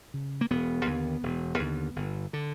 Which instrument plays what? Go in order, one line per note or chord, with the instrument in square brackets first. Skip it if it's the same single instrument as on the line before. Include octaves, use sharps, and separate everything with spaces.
[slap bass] C#3
A#3
E1 B3
D#2 D3
E1
D#2 D3
G1
D3